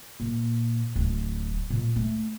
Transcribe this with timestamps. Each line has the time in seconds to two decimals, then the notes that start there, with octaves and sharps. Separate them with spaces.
0.20 A#2
0.96 D1
1.70 A#2
1.96 A3